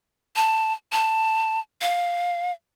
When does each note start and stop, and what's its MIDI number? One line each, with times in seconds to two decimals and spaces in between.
0.36 0.73 81
0.92 1.60 81
1.82 2.52 77